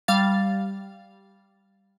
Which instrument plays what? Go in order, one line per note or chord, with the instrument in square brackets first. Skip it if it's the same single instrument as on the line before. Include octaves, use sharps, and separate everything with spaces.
[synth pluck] G3 F5 A6